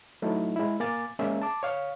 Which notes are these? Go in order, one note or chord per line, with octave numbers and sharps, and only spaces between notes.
F#3 A3 D#4 E4
G#3 E4
A#3 G#5 D6 A6
G#3 A#3 C#4 G#4 E5
A5 D6
C#5 F5